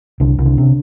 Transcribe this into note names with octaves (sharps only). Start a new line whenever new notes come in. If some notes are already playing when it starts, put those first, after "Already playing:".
C2 D3
C2
D3
C3